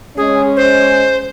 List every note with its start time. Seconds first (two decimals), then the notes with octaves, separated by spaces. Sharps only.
0.17 G#3 C#4 G#4
0.56 C5